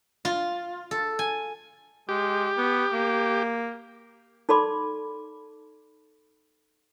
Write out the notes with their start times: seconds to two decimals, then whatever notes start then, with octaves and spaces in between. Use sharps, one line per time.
0.25 F4
0.91 A4
1.19 G#5
2.09 G#3 G4
2.57 B3
2.92 A#3
4.49 D#4 A4 D5 B5 C6 D6